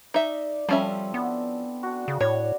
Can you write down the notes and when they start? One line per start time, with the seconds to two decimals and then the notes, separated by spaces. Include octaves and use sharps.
0.14 D#4 D5 E5
0.69 F3 G3 C4 C#4 A4 E5 G#5
1.14 B3 D4 E4 D5
1.83 D4 F#4
2.08 C#3
2.21 A2 C#5 D5